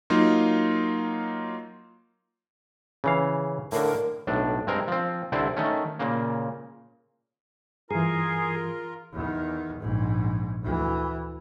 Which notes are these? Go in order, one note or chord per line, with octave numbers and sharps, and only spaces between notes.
F#3 A#3 D#4 F4
C#3 E3 F5
A2 D3 A#4
B1 A2 D4
G2 G#3 C4 A#4
F3 C4
C2 D3 C4 E4 C5 D5
D#3 A3 C#4
A#2 C#3 A#3
G2 E3 F4 G#4 A#4 A#5
E2 D#3
A#1 G#2
D2 E3